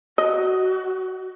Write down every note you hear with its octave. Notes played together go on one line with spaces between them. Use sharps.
F#4 D#5